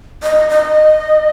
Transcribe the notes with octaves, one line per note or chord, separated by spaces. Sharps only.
D#5
D#5